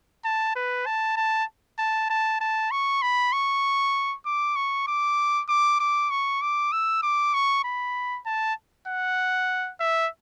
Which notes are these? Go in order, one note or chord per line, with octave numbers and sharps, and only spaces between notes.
A5
B4
A5
A5
A5
A5
A5
C#6
B5
C#6
D6
C#6
D6
D6
D6
C#6
D6
E6
D6
C#6
B5
A5
F#5
E5